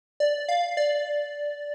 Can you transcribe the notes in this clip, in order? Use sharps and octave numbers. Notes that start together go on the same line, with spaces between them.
D5
F5
D5